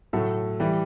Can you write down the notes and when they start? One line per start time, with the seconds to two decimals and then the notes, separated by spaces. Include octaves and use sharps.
0.13 A2 F#3 A3 A4
0.60 E3 G3 G4